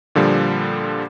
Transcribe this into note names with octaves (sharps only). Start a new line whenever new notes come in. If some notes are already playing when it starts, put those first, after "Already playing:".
A#2 D3 F3 G3